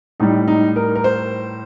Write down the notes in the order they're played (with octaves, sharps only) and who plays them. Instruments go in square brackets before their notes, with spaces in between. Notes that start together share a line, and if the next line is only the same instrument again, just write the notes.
[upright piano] A2 G3 D#4
D#4
A#4
A#4
C5